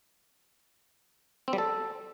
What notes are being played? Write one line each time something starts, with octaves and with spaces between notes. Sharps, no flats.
C4
G3
A4